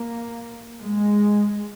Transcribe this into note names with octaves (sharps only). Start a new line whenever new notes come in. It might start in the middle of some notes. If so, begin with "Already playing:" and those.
Already playing: A#3
G#3